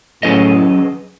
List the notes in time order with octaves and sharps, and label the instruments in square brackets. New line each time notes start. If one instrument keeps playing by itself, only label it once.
[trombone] A2 [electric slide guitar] F#3 C#4 G#4 B4 D#5